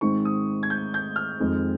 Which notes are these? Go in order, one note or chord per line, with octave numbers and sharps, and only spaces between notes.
G#2 D#3 G#3 C4 C#6
D#6
G#6
G6
G6
F6
F2 D#3 G#3 C4